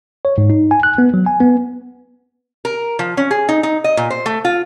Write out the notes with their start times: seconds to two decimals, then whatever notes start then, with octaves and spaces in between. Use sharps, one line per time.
0.25 C#5
0.38 G#2
0.50 D#4
0.71 G#5
0.83 F#6
0.98 B3
1.14 F#3
1.26 G#5
1.40 B3
2.65 A#4
2.99 F3
3.17 C#4
3.31 G#4
3.49 D#4
3.63 D#4
3.84 D#5
3.97 A#2
4.10 C5
4.26 A3
4.45 F4